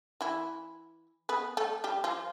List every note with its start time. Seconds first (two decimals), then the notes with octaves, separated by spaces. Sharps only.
0.21 E3 E4
1.29 B3 B4
1.57 A3 A4
1.84 G3 G4
2.04 F3 F4